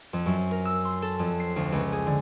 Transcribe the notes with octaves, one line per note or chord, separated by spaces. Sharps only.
F2
F#2
A#4
E6
C6
A4
F2
C7
D2
C#2
G#4
D3